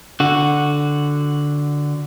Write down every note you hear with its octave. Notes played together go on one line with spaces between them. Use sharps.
D3 F#4